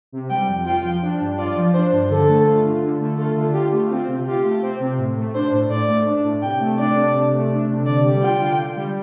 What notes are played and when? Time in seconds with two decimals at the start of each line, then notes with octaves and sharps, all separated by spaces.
0.12 C3
0.30 G3 G5
0.48 F2
0.65 F4 G5
0.83 F3
1.02 D4
1.21 G2
1.37 F4 D5
1.55 F3
1.73 D4 C5
1.92 G2
2.09 D3 A4
2.28 A3
2.45 F4
2.64 D3
2.83 D3
2.99 A3
3.18 F4 A4
3.37 D3
3.54 F4 G4
3.72 A3
3.90 C4 F4
4.08 C3
4.27 F4 G4
4.44 A3
4.62 C4
4.80 C3
4.98 A2
5.17 A3
5.34 D4 C5
5.52 A2
5.70 A2 D5
5.89 A3
6.06 D4
6.24 A2
6.42 C3 G5
6.60 A3
6.78 D4 D5
6.96 C3
7.14 C3
7.33 A3
7.51 D4
7.69 C3
7.86 D3 D5
8.04 G3
8.22 F4 G5
8.40 D3
8.58 D3
8.76 G3